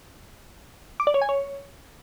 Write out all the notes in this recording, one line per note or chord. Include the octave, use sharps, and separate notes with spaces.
D6
D5
C#5
G#5
C#5